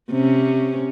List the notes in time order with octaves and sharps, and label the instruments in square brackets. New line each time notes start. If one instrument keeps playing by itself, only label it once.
[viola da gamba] C3 C#4